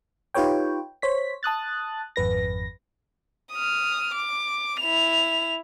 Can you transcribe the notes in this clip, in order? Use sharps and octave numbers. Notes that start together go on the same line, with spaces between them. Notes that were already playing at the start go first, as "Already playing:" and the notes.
D#4 F4 G4 B4 C#5 G5
C5 C#5 B6
A5 D#6 F#6 A6
G#1 F2 B4 A#6
D#6 F6
D6
E4 F7